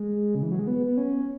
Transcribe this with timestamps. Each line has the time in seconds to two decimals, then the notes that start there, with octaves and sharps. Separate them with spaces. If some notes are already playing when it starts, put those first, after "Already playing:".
Already playing: G#3
0.35 C#3
0.43 E3
0.52 F#3
0.59 G#3
0.67 B3
0.86 B3
0.97 C#4